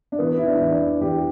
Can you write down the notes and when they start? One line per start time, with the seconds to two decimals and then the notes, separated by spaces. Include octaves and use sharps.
0.12 D4
0.19 E3 B3
0.37 E4
0.47 D4
0.60 E2
0.74 D4
1.01 E2 G4